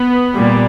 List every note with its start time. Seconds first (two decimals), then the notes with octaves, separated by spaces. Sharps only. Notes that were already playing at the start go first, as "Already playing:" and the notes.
Already playing: B3
0.35 A#2 G3